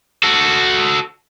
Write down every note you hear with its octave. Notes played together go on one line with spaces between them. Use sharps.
F#4 A4